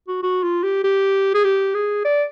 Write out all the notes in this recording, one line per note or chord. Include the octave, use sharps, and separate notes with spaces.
F#4
F#4
F4
G4
G4
G#4
G4
G#4
D5